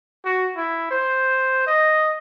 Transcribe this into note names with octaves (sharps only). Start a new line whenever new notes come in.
F#4
E4
C5
D#5